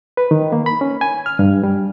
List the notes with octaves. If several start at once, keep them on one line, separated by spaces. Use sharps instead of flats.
B4
D#3
A#3
B5
C#4
G#5
F6
G2
G3